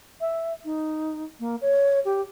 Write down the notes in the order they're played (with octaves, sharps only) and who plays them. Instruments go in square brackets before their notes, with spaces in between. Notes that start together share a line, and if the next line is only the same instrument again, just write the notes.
[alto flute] E5
D#4
A#3
C#5
G4